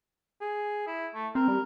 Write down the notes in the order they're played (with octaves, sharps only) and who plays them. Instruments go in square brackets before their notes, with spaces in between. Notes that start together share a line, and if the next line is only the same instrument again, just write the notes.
[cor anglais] G#4
E4
A3
[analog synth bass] C4 [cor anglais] A#4
[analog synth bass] G3